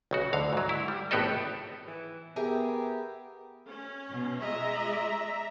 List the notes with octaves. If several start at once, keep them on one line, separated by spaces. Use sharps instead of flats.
B1 C#3 F#4
D2 D3 F5
G#2 F#3
E4
G3
G#1 A2 B3 G4 A4 D#5
E3
B3 G4 G#4 A#4 E5
C#4
B2
G#3 F4 D#5 E5 A#5